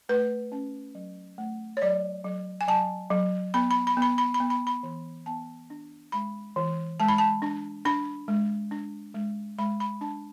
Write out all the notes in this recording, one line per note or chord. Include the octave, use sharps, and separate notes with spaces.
A3 B4
C#4
F#3
A3
C#5
F#3 D5
F#3
G#5
F#3 A5
F#3
B3 B5
B5
B5
B3
B5
B5
B5
B3
B5
B5
E3
B3 A5
D4
G#3 B5
E3
G#3 A5
B5
A5
D4
D4 B5
G#3
D4
G#3
G#3 B5
B5
D4 A5